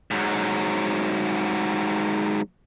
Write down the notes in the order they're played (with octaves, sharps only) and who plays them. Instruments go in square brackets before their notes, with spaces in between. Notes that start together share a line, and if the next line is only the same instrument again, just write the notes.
[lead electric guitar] G#2 F#3